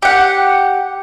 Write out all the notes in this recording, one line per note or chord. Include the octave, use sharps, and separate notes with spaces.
G4 F#5